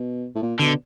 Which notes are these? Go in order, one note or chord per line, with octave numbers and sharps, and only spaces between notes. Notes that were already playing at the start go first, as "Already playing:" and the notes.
Already playing: B2
A2
A#2
B2 D3